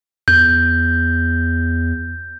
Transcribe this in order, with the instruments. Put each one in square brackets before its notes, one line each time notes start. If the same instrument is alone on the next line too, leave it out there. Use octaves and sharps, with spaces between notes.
[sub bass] E2 [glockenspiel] G6